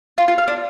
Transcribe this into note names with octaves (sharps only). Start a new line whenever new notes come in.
F4
F4
F5
D4